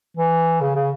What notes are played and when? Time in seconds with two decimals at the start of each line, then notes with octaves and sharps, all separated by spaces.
0.17 E3
0.61 C#3
0.75 C#3